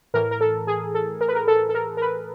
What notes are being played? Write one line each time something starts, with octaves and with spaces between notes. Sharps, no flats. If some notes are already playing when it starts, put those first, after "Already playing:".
A2 E3 A#4
A#4
A4
G#4
A4
A#4
B4
A#4
A4
A4
A#4
A#4
B4